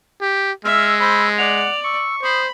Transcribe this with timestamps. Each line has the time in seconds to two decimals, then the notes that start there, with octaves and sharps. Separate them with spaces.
0.21 G4
0.65 G#3 E5 E6 F6
1.00 C5 B5
1.38 D5 F#5 F7
1.84 C#6 E6
2.23 C5 B5 D#6